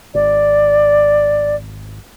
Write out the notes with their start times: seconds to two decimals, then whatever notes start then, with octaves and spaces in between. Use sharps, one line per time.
0.14 G#1 D5